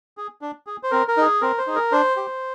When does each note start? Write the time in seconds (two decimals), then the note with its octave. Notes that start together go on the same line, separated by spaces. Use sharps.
0.17 G#4
0.41 D4
0.67 G#4
0.83 C5
0.91 C4 A#4
1.08 A#4
1.17 D#4 G#4
1.41 C4 A#4
1.58 C5
1.67 D#4 G#4
1.75 A#4
1.92 D4 C5
2.16 G4